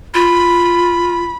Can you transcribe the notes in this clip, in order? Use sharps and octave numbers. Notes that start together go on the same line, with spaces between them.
F4 B5